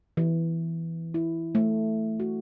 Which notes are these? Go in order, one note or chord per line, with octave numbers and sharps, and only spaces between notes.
E3
E4
A3
F#4